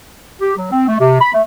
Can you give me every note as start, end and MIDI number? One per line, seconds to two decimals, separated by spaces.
0.41 0.55 67
0.56 0.70 54
0.71 0.84 60
0.88 0.96 57
1.00 1.20 48
1.20 1.32 83
1.33 1.42 57